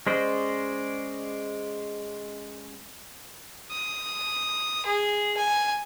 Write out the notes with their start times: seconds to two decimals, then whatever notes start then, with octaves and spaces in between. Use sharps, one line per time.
0.07 G#3 C#4 C5 D5 D#5
3.72 D#6
4.86 G#4
5.37 G#5